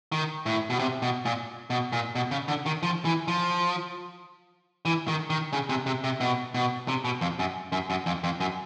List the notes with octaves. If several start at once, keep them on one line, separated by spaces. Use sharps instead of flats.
D#3
A2
B2
C3
B2
A#2
B2
A#2
B2
C#3
D3
D#3
F3
E3
F3
E3
D#3
D#3
C#3
C3
C3
C3
B2
B2
C3
B2
F2
F#2
F#2
F#2
F2
F2
F#2